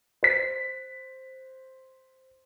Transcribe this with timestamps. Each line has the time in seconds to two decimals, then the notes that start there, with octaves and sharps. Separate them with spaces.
0.23 C5 B6